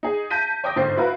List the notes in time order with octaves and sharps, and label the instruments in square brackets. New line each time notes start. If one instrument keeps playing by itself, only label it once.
[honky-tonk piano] D#4 G#4
A5 G6 A#6 B6 D#7
C#5 G5 D6 D#6 A#6
G1 G#2 C5 A6 C7
E4 F#4 B4 F5 A#5